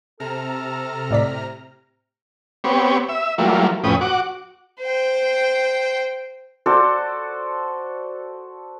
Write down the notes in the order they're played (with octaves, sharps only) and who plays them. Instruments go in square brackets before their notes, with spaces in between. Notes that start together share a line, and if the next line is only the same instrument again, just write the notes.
[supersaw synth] C3 A#5 F6 [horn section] A4
[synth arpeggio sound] A2 D5 B6
[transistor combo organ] B3 C4 G4 C#5
E5
E3 F#3 G3 A3 A#3 F4
F2 A2 C#4 B4 G5 D#6
F#4 F#5 D6
[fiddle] C5 G5
[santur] F#4 A4 C5 D5